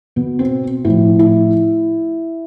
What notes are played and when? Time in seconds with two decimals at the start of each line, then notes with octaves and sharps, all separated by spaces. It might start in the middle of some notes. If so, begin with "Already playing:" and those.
0.16 B2 B3
0.39 C4
0.85 A2 F3 E4
1.19 E4